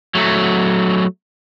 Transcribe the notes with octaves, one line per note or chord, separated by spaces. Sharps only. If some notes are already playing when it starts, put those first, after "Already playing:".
F#3 A3